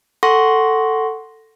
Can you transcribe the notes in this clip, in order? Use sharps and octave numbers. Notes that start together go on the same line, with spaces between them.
A4 F#5 C6 C#6 A#6